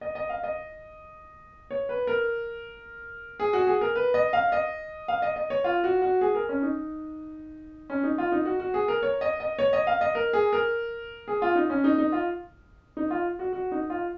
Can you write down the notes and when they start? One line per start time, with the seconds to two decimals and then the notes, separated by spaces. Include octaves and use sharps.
0.01 D#5
0.15 D#5
0.29 F5
0.43 D#5
1.71 C#5
1.89 B4
2.07 A#4
3.40 G#4
3.53 F#4
3.67 G#4
3.81 A#4
3.95 B4
4.14 D#5
4.33 F5
4.52 D#5
5.08 F5
5.22 D#5
5.36 D#5
5.50 C#5
5.64 F4
5.84 F#4
6.02 F#4
6.21 G#4
6.35 A#4
6.49 C#4
6.63 D#4
7.90 C#4
8.04 D#4
8.18 F4
8.32 D#4
8.45 F#4
8.60 F#4
8.74 G#4
8.88 A#4
9.03 C#5
9.21 D#5
9.40 D#5
9.59 C#5
9.73 D#5
9.87 F5
10.01 D#5
10.15 A#4
10.33 G#4
10.53 A#4
11.28 G#4
11.42 F4
11.55 D#4
11.70 C#4
11.84 D#4
11.98 D#4
12.12 F4
12.97 D#4
13.11 F4
13.39 F#4
13.53 F#4
13.72 D#4
13.90 F4